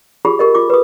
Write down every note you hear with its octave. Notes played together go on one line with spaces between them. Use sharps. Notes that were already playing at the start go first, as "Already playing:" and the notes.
F4 G4 G#4 B5
G4 A#4 D#5
F4 D6
B4 D#6